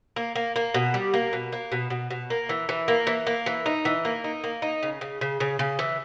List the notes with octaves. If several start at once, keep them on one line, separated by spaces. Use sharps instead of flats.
A#3
A#3
A#3
B2
G3
A#3
B2
A#3
B2
B2
B2
A#3
E3
E3
A#3
E3
A#3
E3
D#4
E3
A#3
D#4
A#3
D#4
C#3
C#3
C#3
C#3
C#3
E3